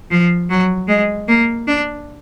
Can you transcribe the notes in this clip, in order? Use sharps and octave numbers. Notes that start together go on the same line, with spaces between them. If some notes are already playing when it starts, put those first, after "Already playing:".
F3
F#3
G#3
A#3
D4